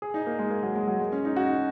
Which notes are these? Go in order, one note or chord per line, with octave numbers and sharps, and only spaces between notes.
G#4
D#4
A#3
G#3
A#3
F#3
G#3
F#3
G#3
C#4
D#4
F#4
D#4